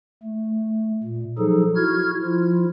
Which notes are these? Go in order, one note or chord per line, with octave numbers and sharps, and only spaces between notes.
A3
A#2
F3 F#3 D#4 G#4 A4
E4 F#4 F6 G#6
F3 E4 F4